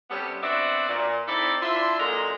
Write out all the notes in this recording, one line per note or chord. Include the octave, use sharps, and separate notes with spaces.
C3 G3 B3 C#4 G4 A4
B3 C4 D4 F#4 D5 E5
A#2
C4 D#4 E4 A4 D5 B5
D4 E4 F4 E5 C6
F#2 A#2 D3 G#3 A#3 A#5